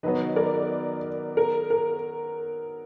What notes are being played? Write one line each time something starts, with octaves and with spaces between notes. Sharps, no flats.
D#3 F#3 B3 B4 D#5
A#4 D5
A#4
A#4